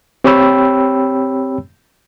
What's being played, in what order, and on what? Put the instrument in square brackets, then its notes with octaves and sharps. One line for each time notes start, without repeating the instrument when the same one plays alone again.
[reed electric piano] C4 G4 C#5 G5 B5 E6